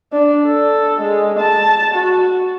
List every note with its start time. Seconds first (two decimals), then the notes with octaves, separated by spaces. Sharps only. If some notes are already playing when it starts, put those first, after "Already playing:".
0.13 D4
0.46 A4
1.00 G#3
1.39 A5
1.94 F#4